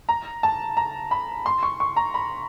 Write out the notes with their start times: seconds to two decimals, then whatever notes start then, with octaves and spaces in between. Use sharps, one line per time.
0.09 A#5
0.43 A5
0.77 A#5
1.11 B5
1.46 C6
1.63 C#6
1.80 C#6
1.96 A#5
2.14 B5